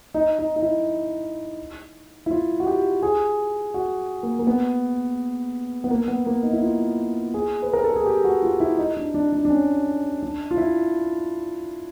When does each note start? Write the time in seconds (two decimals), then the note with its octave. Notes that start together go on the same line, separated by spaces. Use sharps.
0.14 D#4
0.39 D#4
0.56 D#4
0.62 E4
2.26 E4
2.31 F4
2.60 F#4
2.67 G4
3.02 G#4
3.74 F#4
4.23 A#3
4.39 A#3
4.47 B3
5.84 B3
5.91 A#3
6.08 B3
6.26 A#3
6.43 D#4
6.53 E4
6.63 F4
7.34 G#4
7.62 B4
7.73 A#4
7.84 A4
7.96 G#4
8.06 G4
8.24 F#4
8.43 F4
8.60 E4
8.78 D#4
8.97 D4
9.14 D4
9.33 D4
9.45 D4
9.50 C#4
10.23 D4
10.51 F4
10.57 E4